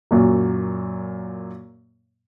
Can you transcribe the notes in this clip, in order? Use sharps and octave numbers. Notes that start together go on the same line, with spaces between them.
F#2 A#2 F#3